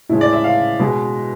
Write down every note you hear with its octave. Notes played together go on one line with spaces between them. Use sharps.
A2 E3 G#3 E4
D5
E5
F5
B2 G#3